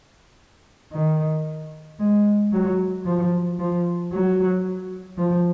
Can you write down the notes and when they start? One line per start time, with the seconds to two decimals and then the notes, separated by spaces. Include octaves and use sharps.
0.92 D#3
1.99 G#3
2.52 F#3
3.05 F3
3.59 F3
4.13 F#3
5.18 F3